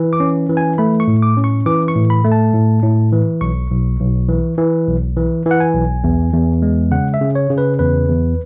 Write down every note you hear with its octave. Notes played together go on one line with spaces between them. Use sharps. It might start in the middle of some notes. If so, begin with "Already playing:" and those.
Already playing: E3
D6
C#4
E3
G#5
A3 B5
C#6
A2
D6
C#4
C#6
E3 D6
C#6
A2
B5
A3
A5
A2
A2
E3
B1 C#6
B1
B1
E3
E3
B1
E3
E3
F#5
G#5
B1
E2
E2
G#3
C#3 F#5
E5
C#3
C#5
C#3
B4
E2 B4
E2